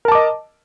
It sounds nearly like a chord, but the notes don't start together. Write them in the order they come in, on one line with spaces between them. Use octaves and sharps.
A#4 A5 D6 D#5